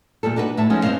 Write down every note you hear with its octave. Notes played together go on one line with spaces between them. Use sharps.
E2 A#2 G3 A4
D4 D#4 F#4 G4 B4
A2 E5 A5
F3 G#3 B3 C#4 D#4
G2 C4 C5 D#5 F5